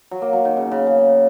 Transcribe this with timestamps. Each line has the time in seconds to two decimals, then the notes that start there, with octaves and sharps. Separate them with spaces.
0.11 F#3
0.22 A#3
0.33 F#3
0.45 D#3
0.57 C#3
0.71 C#3
0.87 C#3